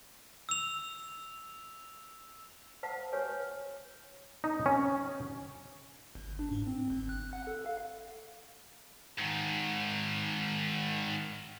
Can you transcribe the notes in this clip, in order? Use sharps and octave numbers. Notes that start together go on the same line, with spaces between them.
E6 F7
C5 F5 F#5 A5
G4 B4 C#5 G#5
D#4
C#4
G1
D4
G#2
C4
G1
F#6
F#5
A4
F5
G#2 D#3